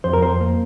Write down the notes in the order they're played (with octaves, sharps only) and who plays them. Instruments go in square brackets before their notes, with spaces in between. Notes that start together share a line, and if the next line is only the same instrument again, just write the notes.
[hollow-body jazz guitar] F2 C5
A#4
F2 C5
A#3